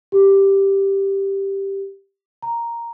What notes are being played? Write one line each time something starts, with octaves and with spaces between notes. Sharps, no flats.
G4
A#5